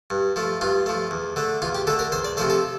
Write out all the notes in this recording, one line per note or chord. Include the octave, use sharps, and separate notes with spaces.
G2
F3 A3
G2 F4
F3 A3
E2
D3 A3
E2 F4
G4
D3 A3 A4
A#4
E2 C5
D5
C3 F3 A3 C5
A4